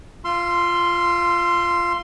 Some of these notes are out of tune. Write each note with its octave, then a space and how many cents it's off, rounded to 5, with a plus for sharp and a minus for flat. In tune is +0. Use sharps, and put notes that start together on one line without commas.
F4 -10 C6 +0 E6 +45